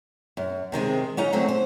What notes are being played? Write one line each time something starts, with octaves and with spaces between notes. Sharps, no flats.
F#2
C3 D#3 G#3 C4
F#3 C#4 D#4 A#5
D3 F#3 A3 C4
C5